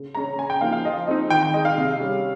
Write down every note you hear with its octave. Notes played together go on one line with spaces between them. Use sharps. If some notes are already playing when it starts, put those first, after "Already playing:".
Already playing: C#3
G#3 C#4 A#5
C#3 G#5
G5
F3 A#3 D#4 F5
F5
F3 D#5
C4 D#4 D#5
D#3 G5
G5
G#3 D#4 D#5
F5
C3
G3 C#4